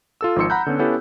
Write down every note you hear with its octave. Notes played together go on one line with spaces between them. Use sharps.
F4 A4 E6
G#1 F3 D#4 C6 E6 C#7
F#5 A#5 B5 F#6 G6
D3 B3 C#4
B3 C#4 E4 G4 A4